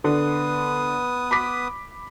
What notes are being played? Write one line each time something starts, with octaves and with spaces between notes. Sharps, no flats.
D3 B3 B4 D#6
B5 D6 B6